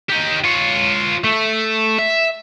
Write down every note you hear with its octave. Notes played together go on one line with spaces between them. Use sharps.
D#4 G4
F4 C#5
A3
E5